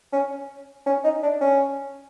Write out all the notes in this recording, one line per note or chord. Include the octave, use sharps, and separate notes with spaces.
C#4
C#4
D#4
D4
C#4